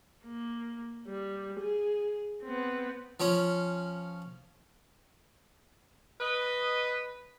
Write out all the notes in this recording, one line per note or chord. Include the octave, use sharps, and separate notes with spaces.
A#3
G3
G#4
B3 C4
F3 C#4
B4 D#5